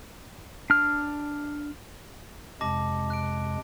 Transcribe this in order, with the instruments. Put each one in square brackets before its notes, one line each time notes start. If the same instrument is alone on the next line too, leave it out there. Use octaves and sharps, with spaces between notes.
[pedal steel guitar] D4 F6
[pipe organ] F2 C3 G#3 [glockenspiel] A5 D6 A#6
[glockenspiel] F#6 D7